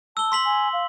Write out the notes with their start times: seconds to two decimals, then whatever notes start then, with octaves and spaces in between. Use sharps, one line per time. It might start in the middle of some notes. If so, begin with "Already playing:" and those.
0.17 A5 E6 G7
0.32 C6 B6 F#7
0.45 G#5
0.73 F5